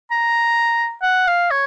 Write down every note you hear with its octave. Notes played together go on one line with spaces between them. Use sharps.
A#5
F#5
F5
C#5